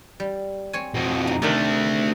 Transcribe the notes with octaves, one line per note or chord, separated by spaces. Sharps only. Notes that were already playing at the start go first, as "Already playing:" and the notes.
G3
C4 C#5 G#5
F2 B2
D#4
C3 D#3 A3 D4 G4